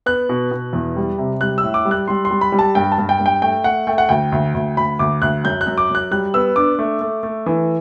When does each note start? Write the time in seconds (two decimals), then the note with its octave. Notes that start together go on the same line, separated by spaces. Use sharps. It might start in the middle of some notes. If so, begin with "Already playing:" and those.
0.06 B3 F#6
0.29 B2
0.51 B2
0.73 E2
0.96 G3
1.18 C3
1.41 G3 F#6
1.58 E6
1.63 A2
1.74 D6
1.85 G3
1.91 F#6
2.08 G3 C6
2.25 C6
2.31 G3
2.41 B5
2.52 G3
2.59 A5
2.75 G2 G5
2.92 A5
2.98 G2
3.09 G5
3.20 G2
3.26 G5
3.42 A3 G5
3.64 A3 F#5
3.87 A3 G5
3.98 F#5
4.09 D2 G5
4.32 D2
4.54 D2
4.77 D2 B5
4.99 D2 D6
5.22 D2 F#6
5.44 F#2 G6
5.61 F#6
5.67 F#2
5.78 D6
5.90 F#2 F#6
6.11 G3 F#6
6.34 B3 E6
6.56 D4 D6
6.79 A3
7.01 A3
7.23 A3
7.46 E3